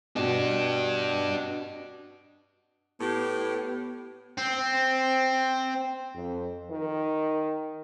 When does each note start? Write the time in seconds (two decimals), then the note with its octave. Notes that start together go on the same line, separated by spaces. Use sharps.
0.16 B2 D4 G4
3.01 A2 B3 G4
4.38 C4
6.15 F2
6.70 D#3